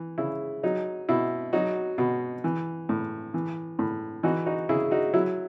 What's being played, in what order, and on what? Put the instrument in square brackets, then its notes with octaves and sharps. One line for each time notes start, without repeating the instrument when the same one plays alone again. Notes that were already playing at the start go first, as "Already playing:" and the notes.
Already playing: [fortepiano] E3
C#3 E4
F#3 D#4
B2 E4
F#3 D#4 F#4
B2
E3
A2
E3
A2
E3 D#4 F#4
D#4 F#4
C#3 E4 G#4
D#4 F#4
F#3 E4